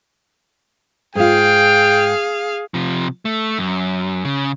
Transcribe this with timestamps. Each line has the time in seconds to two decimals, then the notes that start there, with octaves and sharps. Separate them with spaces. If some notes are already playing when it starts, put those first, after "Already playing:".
1.15 G#2 F4 G#4 F5 G5
2.74 C3 F3
3.25 A3
3.59 F#2
4.25 C#3